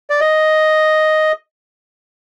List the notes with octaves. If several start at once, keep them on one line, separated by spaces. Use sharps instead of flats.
D5
D#5